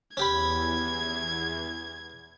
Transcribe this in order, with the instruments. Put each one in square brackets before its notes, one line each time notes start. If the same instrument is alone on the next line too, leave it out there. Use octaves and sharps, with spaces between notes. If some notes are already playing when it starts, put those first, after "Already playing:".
[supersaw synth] E2 [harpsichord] C#4 G4 B5 [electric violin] G#6